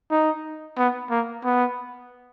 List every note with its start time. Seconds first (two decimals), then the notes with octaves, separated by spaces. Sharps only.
0.11 D#4
0.78 B3
1.10 A#3
1.45 B3